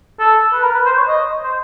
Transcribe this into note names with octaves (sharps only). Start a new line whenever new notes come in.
A4
B4
A#4
B4
C5
C#5
D#5
C5